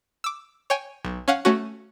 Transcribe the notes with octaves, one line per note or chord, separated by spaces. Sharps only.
D6 E6
C#5 G5 G#5
B1
C#4 F5 F#5
A3 C#4 F#4